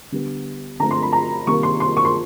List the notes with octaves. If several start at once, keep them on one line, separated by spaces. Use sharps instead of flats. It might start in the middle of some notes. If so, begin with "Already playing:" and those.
D3 G3 B3
D3 F3 A3 C4 A#5
C6
B5
A#5
C3 D#3 G3 A#3 C#6
C6
C6
C#6
C6